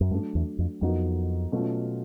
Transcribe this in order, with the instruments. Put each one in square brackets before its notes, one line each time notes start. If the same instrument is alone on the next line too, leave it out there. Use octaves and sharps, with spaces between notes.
[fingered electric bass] F#2
[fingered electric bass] G2 [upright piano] F#3 A3 D4
[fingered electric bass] E2
F2
[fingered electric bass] F2 [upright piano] F#3 B3 D#4 F#4 A#4
[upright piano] B2 F#3 A3 C#4 F4